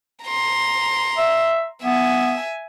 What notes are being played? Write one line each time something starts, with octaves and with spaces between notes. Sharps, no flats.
A#5 C6
E5
B3 E5 G#5